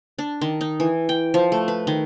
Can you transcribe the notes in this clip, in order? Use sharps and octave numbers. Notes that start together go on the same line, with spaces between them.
D4
D#3
D#4
E3
G5
F3
A3
B4
D#3